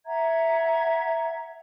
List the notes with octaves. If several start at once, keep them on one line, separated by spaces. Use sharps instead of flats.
E5 F#5 A#5 G#6